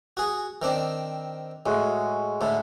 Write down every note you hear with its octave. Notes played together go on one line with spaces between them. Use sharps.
F#4 G#4
D#3 C4 D4
A2 G#3 F#4
A2 D3 A4 E5 B5